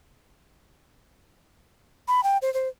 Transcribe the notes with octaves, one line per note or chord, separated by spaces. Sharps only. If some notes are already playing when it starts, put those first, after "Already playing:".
B5
G5
C5
C5